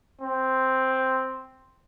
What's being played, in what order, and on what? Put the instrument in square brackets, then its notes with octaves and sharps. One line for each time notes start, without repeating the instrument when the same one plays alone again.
[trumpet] C4